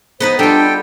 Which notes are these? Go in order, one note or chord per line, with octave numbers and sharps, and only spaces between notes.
B3 D#4 B4 C5
G3 D4 F4 A4 G5